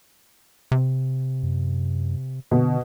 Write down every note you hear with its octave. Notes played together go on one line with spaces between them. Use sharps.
C3
F#2
B2 D3